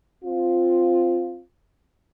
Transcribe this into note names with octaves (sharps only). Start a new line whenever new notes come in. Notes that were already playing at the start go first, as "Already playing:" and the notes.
C4 F4